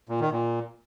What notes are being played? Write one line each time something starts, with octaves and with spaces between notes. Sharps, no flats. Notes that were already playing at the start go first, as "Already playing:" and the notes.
A#2
D#3
A#2